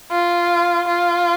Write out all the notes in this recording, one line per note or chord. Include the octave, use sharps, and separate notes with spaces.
F4
F4